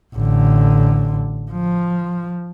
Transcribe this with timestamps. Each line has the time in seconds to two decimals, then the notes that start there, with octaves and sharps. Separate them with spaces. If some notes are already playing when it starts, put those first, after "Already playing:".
0.15 A1 D3
1.52 F3